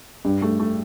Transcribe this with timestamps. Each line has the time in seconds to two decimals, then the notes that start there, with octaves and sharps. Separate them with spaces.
0.25 G2
0.42 A3
0.60 A3